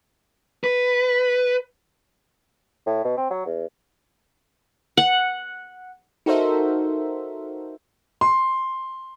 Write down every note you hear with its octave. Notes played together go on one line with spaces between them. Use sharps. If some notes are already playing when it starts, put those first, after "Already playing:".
B4
A2
B2
C4
F#3
E2
F#5
D#4 F#4 A4 A#4 C5 E5
C6